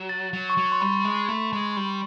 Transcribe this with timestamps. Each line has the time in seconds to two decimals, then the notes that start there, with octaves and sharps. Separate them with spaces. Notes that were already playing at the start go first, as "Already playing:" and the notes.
Already playing: F#3
0.09 A6
0.33 F#3
0.50 C#6
0.57 F#3
0.72 C6
0.81 G3 B5
1.05 G#3
1.28 A3
1.53 G#3
1.77 G3